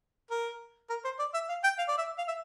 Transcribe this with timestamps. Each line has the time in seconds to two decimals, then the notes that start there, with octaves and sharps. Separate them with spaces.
0.31 A#4
0.90 A#4
1.05 C5
1.19 D5
1.34 E5
1.49 F5
1.63 G5
1.78 F5
1.88 D5
1.98 E5
2.18 F5
2.28 E5